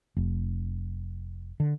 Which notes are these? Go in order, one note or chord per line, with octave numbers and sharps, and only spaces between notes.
F1
D3